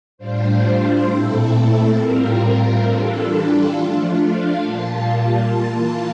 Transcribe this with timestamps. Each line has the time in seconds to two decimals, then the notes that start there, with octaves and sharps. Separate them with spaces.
0.18 A2 G3 D4 F4 C5
1.06 A#2 A3 C4 E4 A4
1.95 A2 G3 C4 F4 A#4
2.83 E3 G3 D4 F4 A4
3.72 F3 A3 D4 F4
4.17 F5
4.61 A#2 G3 A#3 F4 A5
5.50 E3 A#3 F4